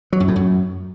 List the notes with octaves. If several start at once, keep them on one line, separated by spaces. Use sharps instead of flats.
F#3
F#2
A2
F#2